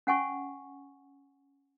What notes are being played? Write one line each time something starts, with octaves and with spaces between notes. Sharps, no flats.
C#4 F#5 G#5 C#6